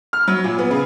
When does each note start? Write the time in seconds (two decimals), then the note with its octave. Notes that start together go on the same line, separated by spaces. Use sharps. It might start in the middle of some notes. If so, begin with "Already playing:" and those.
0.13 F6
0.28 F#3
0.44 A#2
0.59 B3
0.71 C#3